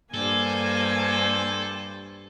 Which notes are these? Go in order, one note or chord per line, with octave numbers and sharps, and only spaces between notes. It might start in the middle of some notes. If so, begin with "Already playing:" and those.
G2 G3 A#3 A4 C5 G#5